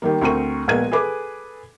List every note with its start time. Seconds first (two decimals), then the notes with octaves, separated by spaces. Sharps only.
0.02 D#3 G3 A#3
0.22 D2 C4 A#4 C#6 D#7
0.68 A#1 G#3 B3 A#4 G#6 D#7
0.92 G#4 A4 B4 D6